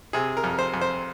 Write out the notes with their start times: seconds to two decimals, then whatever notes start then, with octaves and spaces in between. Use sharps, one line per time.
0.13 C3 G#4
0.37 A#4
0.44 F2
0.59 C5
0.74 F2
0.81 C5